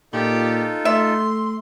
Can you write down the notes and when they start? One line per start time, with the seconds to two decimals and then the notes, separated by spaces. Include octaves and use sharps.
0.13 A#2 D#4 F4 G4 A4
0.85 A3 E5 C6